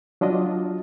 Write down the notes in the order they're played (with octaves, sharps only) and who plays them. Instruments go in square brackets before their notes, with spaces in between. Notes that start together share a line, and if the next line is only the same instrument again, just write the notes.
[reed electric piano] F#3 D4 F4 D#5